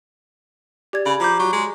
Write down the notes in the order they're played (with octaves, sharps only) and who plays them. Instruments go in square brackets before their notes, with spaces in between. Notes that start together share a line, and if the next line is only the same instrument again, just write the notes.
[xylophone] G4 D5 G#6
[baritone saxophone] C#3 [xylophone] B5
[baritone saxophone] F3 [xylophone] A#5 D6 G6
[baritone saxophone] F#3 [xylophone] C#6
[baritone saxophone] G#3